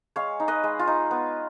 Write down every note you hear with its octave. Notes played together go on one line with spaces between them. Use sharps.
G#3 C#5 F5
D#4
B4 D#5
G#3
F4
D#4
B3